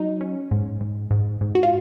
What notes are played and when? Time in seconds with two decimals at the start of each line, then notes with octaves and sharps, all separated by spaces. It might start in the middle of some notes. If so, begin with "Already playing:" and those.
Already playing: F#3 D#4
0.21 C#4
0.51 G#2
0.81 G#2
1.11 G#2
1.41 G#2
1.55 F#4
1.63 F4